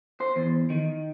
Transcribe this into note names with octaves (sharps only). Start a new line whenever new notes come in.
C5
E2
D#3